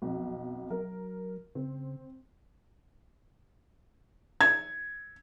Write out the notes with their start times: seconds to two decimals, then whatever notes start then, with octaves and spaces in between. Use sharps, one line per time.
0.02 B1 F2
0.70 F#3 A#4
1.55 C#3 C4
4.41 G#6